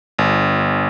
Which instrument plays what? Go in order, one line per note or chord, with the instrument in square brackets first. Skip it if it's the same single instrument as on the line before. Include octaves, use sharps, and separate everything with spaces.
[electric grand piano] G1